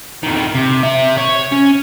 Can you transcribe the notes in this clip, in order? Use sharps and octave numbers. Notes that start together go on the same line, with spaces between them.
F2 D#3
C3
C3 E5
C#5
C#4